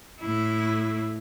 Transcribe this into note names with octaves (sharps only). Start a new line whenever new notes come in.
A2 E4